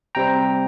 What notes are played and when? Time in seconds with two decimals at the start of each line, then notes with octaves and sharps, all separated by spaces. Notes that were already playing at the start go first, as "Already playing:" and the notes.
0.15 C3 G3 C4 G5 A#5